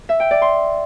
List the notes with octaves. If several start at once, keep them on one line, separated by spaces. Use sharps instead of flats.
E5
G5
D5
C6